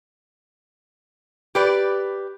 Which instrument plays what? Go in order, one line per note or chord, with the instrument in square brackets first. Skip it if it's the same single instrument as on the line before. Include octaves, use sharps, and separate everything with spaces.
[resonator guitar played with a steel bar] G4 B4 D5